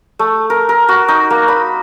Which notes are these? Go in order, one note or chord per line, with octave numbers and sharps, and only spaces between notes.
A3
A#4
A#4
F#4
D#4
A#3
B5